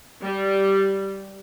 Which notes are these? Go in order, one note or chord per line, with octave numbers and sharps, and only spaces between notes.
G3